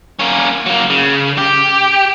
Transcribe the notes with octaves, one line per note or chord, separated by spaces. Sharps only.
A#3 C#4
F#3 A#3
C#3
G4